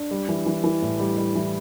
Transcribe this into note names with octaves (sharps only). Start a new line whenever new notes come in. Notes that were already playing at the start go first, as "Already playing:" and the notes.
Already playing: D4
G3
E3
E3
E3
A2
G3
G3
E3